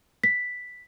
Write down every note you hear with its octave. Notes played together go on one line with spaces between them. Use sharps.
B6